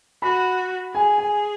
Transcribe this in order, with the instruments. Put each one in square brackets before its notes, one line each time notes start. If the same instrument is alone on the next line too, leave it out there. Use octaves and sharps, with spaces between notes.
[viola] F#4 [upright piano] B5
[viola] G#4 [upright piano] G#5
[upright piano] G#5